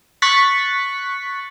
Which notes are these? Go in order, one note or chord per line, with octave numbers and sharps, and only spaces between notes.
C#6 F#6 A6 B6